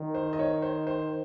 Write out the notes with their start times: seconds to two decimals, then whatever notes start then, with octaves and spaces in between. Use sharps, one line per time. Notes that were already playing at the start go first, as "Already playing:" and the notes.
Already playing: D#3
0.15 C5
0.33 D#5
0.39 C#5
0.62 C5
0.87 C5